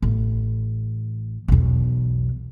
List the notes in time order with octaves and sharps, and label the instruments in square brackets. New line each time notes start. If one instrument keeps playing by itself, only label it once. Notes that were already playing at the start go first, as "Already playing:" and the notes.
[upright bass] A1
B1 E2